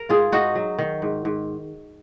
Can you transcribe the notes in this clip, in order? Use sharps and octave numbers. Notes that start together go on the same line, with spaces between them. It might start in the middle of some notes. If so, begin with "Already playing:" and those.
Already playing: A#4
G#2 F4 G#4
G#2 D#4 F#4
F#3
D#3
G#2
G#2